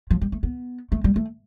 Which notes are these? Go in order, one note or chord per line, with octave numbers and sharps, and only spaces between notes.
F3
G3
A3
B3
A3
G3
A3